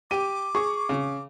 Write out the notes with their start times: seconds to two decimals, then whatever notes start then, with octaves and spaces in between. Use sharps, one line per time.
0.11 G4 D6 D#7
0.55 G#4 C#6
0.89 C#3